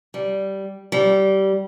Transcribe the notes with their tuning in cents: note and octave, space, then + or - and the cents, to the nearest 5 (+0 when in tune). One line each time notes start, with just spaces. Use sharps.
G3 -10
G3 -20